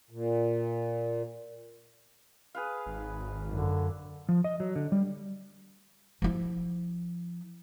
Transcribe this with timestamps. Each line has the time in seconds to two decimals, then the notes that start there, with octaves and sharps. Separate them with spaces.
0.11 A#2
2.55 G#4 B4 F5
2.86 G#1
3.49 F#2 D3
4.29 F3
4.44 D#5
4.60 F#3
4.76 D3
4.92 G3
6.22 F3 E4